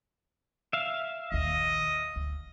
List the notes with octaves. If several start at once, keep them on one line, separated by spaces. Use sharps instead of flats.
E5 F5
A#1 D#2 D#5
D2